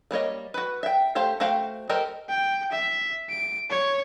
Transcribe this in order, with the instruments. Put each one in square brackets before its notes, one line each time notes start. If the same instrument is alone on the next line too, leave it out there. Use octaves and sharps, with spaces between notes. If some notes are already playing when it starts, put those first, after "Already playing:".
[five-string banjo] G3 A#3 C#5 D#5
F#4 B4
E5 G5
A3 G4 C5 F5
A3 F#4 C5 F5 G5
G4 A4 A#4 C5 D#5
[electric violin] G5
E5
D7
C#5